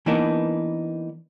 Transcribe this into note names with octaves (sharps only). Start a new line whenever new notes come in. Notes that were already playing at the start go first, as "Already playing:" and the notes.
E3 A#3 B3 D4 D#4 A#4